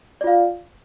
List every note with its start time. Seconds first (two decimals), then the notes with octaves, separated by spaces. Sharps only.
0.21 D5
0.24 F4
0.27 F5